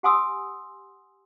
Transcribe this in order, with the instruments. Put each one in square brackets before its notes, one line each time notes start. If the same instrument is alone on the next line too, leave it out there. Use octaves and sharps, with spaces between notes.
[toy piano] G4 F#5 G#5 C6 D#6 E6